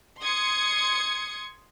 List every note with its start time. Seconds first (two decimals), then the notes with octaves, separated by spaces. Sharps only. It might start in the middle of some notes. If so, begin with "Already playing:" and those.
0.20 C6 D#6 G#6 C#7